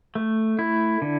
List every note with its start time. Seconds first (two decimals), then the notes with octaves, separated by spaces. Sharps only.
0.15 A3
0.59 E4
1.02 D3